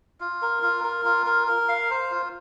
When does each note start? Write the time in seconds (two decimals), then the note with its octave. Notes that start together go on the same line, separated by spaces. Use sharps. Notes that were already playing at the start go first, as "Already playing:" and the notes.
0.20 F4
0.42 A#4
0.63 F4
0.84 A#4
1.05 F4
1.26 A#4
1.48 A#4
1.69 F5
1.91 C5
2.11 F4